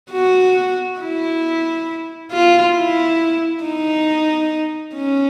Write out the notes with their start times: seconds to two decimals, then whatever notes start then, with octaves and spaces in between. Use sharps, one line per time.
0.12 F#4
0.99 E4
2.32 F4
2.75 E4
3.63 D#4
4.95 C#4